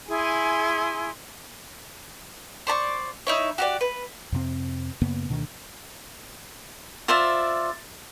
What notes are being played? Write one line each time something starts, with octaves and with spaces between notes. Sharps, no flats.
E4 G#4 G#5 C6
C5 D5 A#5 C#6
D#4 E4 C#5
F#4 G4 D5
B4
F2 C3 C4
F#2 C#3 A#3 B3
D2 B2 D3 D#3
F4 C5 D5 E5